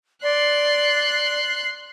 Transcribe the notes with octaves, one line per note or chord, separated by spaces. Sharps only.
D5 C6 F#6